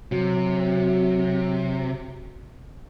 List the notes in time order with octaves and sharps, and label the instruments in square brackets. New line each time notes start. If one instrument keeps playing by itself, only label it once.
[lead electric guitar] C3 [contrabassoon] F#3